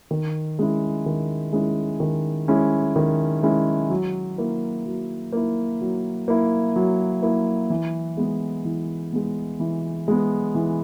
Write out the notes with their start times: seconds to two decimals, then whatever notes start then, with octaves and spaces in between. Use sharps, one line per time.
0.11 D#3
0.59 G#3 C#4 E4
1.06 D#3
1.53 G#3 C#4 E4
2.00 D#3
2.48 G#3 C#4 E4
2.96 D#3
3.43 G#3 C#4 E4
3.90 F#3
4.38 A#3 E4
4.86 F#3
5.32 A#3 E4
5.81 F#3
6.28 A#3 E4
6.76 F#3
7.22 A#3 E4
7.70 E3
8.17 G#3 B3
8.65 E3
9.13 G#3 B3
9.60 E3
10.08 G#3 B3
10.55 E3